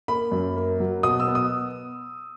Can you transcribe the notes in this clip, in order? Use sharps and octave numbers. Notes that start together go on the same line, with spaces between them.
A#3 B5
F#2
A#3
F#3
B2 D#6
E6
B3
D#6